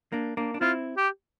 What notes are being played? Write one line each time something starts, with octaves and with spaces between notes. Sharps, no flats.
A#3 D4
A#3 D4
D4
C4 E4 F4
G4